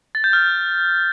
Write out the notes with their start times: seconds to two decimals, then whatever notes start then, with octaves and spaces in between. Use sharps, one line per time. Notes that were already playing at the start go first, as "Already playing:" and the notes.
0.15 A6
0.24 G6
0.33 F6